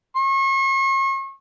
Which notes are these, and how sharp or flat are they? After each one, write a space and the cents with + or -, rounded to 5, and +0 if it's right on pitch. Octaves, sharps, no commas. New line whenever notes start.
C#6 -40